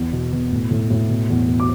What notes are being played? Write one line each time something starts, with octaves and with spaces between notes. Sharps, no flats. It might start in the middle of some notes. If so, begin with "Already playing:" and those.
Already playing: E2
B2
B2
A2
A2
A2
B2
E2
E2
D6